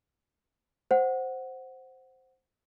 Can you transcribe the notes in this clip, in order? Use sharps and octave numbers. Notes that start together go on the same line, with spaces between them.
C5 F#5